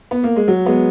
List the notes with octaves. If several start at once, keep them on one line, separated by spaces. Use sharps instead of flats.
B3
A#3
G#3
F#3
G#3 B3